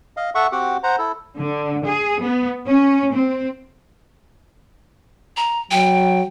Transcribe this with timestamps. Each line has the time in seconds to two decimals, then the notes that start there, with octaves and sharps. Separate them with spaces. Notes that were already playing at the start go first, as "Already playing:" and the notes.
0.17 D#5 F5
0.35 A4 E5 F#5 C#6
0.52 C4 F#4 G4 F#5 D6
0.83 C5 F#5 A#5
0.98 E4 A4
1.39 D3
1.86 G#4
2.22 B3
2.65 C#4
3.14 C4
5.37 A#5
5.71 F#3 G5